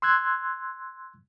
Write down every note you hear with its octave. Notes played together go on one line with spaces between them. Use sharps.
C6 E6 F#6 G#6